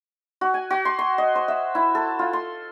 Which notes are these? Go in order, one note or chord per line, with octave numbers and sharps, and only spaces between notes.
F#4
G#5
F#4
C6
C6
D#5
C5
E5
E4
A4
F4
C6